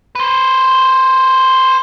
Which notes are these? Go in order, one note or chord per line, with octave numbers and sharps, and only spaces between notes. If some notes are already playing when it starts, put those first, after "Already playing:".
B4 C5